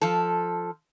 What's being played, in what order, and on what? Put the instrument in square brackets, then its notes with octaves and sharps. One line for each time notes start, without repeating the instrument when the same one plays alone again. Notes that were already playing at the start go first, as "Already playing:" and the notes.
[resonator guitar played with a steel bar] F3 A4